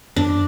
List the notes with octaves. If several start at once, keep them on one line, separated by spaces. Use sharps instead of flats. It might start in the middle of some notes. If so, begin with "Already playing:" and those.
F#2 D4